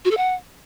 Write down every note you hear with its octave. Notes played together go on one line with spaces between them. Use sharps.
F#4
A4
F#5